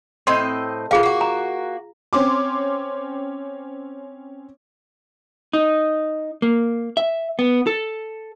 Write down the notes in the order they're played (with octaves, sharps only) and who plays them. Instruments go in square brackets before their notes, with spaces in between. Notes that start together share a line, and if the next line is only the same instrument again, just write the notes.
[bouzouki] A2 C4 D#5 [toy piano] C6
[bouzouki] A2 A#4 [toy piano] F4 G#4 F5
[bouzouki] A#3 F#4
[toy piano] A#5
[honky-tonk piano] C4 C#4 C6 D6
[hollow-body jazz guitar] D#4
A#3
E5
B3
A4